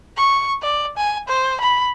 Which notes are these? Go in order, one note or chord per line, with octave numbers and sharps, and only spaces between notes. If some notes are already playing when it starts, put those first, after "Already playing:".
C#6
D5
G#5
C5
B5